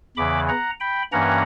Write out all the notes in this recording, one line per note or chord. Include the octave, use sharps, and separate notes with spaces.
E2 C#3 E3 B5 D6
F#5 A#5
G5 B5
G2 E3 A#3 C#4 F#5 A#5